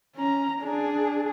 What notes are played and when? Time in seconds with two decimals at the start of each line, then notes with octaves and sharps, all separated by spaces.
0.16 C#4 A#5
0.61 D4 G#4